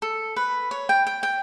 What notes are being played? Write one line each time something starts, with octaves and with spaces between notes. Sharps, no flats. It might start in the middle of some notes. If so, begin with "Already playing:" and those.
A4
B4
C#5
G5
G5
G5